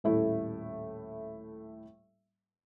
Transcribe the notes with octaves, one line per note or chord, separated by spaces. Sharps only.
D#1 A2 A3 E4